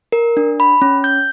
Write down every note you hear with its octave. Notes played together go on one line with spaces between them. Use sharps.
A#4
D4
B5
C#4
G6